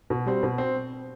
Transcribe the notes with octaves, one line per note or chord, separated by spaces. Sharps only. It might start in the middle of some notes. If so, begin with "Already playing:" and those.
B2
G3 C4
B2
C4